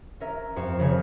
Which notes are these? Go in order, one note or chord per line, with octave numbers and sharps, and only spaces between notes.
C#4 A#4 E5
F2 C#6 E7
F2 C#3 A#4 C#5 G#5